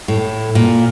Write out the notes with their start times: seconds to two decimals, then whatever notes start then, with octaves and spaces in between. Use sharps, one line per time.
0.08 A2
0.55 A#2